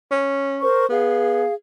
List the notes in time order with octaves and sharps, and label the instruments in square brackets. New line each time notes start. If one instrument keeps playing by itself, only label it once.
[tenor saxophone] C#4
[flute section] A#4 C5 C#6
[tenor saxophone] B3 [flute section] G#4 F5